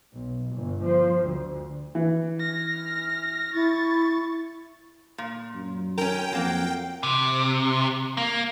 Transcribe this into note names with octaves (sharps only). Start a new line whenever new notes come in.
B1
G1
F3
D2
E3
F6 A#6
E4 C#6 A6
A#2
F#2
C#4 A#4 G5
F2 F#3 A#3
C3
A#3